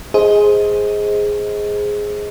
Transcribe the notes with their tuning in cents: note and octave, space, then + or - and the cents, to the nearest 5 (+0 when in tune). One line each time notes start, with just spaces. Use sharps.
G#4 +0 C5 +0 D#5 +20